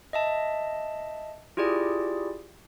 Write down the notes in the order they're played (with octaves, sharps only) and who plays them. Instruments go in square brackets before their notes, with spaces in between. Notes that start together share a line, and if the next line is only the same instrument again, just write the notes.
[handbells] D#5 E5 A5
E4 F4 G4 G#4 D5